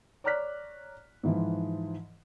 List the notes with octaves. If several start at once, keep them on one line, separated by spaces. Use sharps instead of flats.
C#5 D5 A#5 F6 F#6 B6
G#2 E3 F3